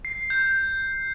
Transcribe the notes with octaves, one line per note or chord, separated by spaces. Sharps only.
C7
G6